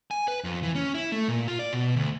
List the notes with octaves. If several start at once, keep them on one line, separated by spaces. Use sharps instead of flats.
G#5
B4
F2
E3
C#4
E4
A3
A#2
F4
D5
B2
D2